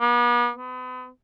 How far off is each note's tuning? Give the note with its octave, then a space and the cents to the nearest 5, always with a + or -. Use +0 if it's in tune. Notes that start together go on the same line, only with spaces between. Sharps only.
B3 -45
B3 +40